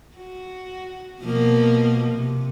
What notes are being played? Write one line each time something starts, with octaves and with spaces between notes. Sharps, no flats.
F#4
B2 F3 A#3
C3